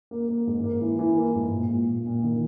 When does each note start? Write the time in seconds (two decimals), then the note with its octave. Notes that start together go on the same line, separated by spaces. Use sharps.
0.11 A#3
0.28 A#3
0.47 G#2
0.64 A#3
0.81 E3
0.99 E3
1.16 A#3
1.35 G#2
1.52 A#2
1.70 A#2
1.88 A#2
2.06 A#2
2.23 D#3